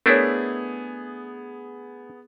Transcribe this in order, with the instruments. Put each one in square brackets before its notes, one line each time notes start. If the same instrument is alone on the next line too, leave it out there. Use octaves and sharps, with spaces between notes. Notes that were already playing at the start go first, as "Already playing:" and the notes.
[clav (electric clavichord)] A3 D4 E4 [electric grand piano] B3 G#4 [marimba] A#4 C#5